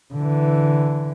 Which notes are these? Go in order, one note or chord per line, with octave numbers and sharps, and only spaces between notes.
D3 E3